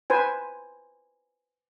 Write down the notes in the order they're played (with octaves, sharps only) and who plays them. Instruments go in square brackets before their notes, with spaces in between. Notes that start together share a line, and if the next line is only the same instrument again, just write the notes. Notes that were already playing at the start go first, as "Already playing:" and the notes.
[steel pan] B4 C5 G#5